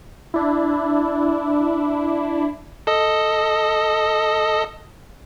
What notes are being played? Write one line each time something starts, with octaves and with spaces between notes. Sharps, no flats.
D4 E4
A4 D#5